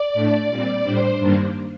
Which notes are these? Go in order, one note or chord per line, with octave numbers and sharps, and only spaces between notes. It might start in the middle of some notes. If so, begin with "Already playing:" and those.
Already playing: D5
A2 A3 D4
A#2 G3 C4
A2 G3 D4 C5
G2 D#3 G3 A#3 D4